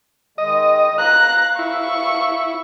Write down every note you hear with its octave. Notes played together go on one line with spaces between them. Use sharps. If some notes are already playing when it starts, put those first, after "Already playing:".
D#3 G#3 D#5
F5 A#5 F#6
E4 C#6